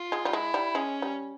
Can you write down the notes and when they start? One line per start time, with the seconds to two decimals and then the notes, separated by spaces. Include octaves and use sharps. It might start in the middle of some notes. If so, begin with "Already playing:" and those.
Already playing: F4
0.12 G#3
0.25 G3
0.33 G#3 E4
0.54 G3
0.75 G#3 C#4
1.02 G3